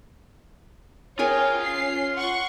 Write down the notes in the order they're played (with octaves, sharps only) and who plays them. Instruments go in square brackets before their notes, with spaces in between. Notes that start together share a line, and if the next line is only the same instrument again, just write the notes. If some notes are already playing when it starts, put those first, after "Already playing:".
[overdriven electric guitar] F4 F5 [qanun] G#4 A#4 G#5 [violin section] C#5 G5
[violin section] C#4 C7
F#5 C6 C#6